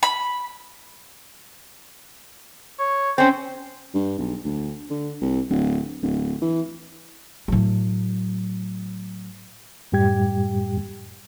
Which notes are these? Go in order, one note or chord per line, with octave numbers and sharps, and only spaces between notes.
B5
C#5
C4 C#4 C5
G2
B1
D2
D3
C2
D1
D1
E3
A2 F#3
F#2 A2 G3 G4 G5 G#6